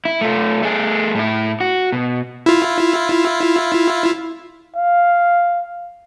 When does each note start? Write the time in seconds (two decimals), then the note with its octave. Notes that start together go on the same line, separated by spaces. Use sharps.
0.05 E4
0.21 A3 F4
0.62 A3 G#4
1.15 A2 E4
1.60 F#4
1.92 B2
2.46 E4 F4
4.76 F5